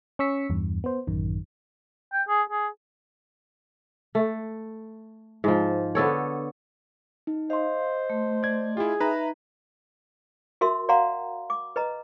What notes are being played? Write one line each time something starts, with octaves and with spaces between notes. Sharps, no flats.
C#4 C#6 E6 B6 C#7
E2 G2
B3 C5
A1 F#2 D#3
G5
G#4
G#4
A3
G#2 F3
D3 B3 A4 C#5
D#4
C5 D#5 F5 C6
A3
D5 G#6
E4 F4 G#4
D#4 B4 E5 A#5 B5
F#4 A#4 E5 C6
D5 F5 F#5 A#5 C6
D6
B4 D#5 A#5